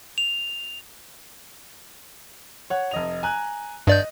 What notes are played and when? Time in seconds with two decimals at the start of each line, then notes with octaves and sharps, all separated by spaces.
0.18 F7
2.70 C#5 F#5
2.91 F1 D#5 F7
3.23 G#5 A#5 F#6
3.87 G2 D5 D#5 G6